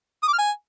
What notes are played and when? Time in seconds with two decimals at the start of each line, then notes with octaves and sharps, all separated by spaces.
0.23 D#6
0.28 D6
0.33 F6
0.38 G#5